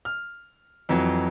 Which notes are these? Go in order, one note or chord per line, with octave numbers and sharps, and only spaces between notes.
F6
F2 E3 F#3